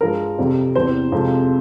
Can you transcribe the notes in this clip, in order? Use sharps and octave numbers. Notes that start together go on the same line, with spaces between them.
G2 F3 G#3 A#4
F2 C3 G3
E2 C3 G3 C4 C5
F2 C3 F3 G#3 C4